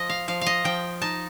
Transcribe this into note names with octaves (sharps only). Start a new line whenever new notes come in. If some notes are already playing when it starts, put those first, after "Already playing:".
Already playing: F3 D#5
F5
F3 F5
F5
D#5
F3 G5
D#4 A5